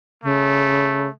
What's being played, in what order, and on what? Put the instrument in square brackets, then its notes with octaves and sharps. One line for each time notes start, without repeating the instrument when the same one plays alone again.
[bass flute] C#3 [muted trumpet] A3